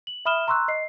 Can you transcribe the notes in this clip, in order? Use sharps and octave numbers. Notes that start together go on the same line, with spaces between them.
F#7
E5 B5 D#6 F6 E7 G7
A#5 C6 C#6 E6 F#6
D#5 C7